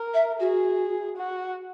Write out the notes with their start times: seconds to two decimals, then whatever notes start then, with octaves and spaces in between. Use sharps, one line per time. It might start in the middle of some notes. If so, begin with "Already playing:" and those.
Already playing: A#4
0.14 E5
0.40 F#4 G#4
1.17 F#4